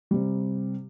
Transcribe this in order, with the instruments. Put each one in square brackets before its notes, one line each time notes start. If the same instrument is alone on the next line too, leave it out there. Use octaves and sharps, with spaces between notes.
[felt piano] C3 G3